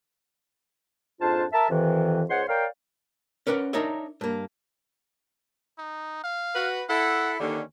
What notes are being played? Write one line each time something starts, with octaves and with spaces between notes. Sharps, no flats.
F2 G#2 D4 F4 C5 A5
A#4 E5 A5
F2 C3 D#3 E3
C#2 G#3 C5 C#5 F#5 C6
A#4 C#5 D5 F5 G5
C#4 A#4 B4 D5 F#5
D4 D#4 A#4 C#5 E5
G2 A#3
D#4
F5
F#4 B4
E4 A4 F#5
D#2 D3 C#4